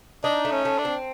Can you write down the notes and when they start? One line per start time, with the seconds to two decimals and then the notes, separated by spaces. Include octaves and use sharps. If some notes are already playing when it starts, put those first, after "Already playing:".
0.24 D4 D#4
0.45 A3
0.52 C#4
0.65 A3
0.78 D4
0.85 C4